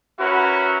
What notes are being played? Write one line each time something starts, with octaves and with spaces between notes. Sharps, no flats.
C#4 E4 F#4 A#4 B4